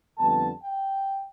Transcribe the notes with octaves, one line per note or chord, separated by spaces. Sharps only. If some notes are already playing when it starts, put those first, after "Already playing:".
F2 D3 G3 B3 A5
G5